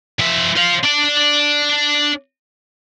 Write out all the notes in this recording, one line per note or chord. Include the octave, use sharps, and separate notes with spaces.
F3 E5
C5 F5
D4 D5